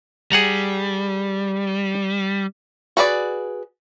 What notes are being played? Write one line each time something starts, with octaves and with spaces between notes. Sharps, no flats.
G3 G#4 F#5 A#5
F#4 G#4 B4 D5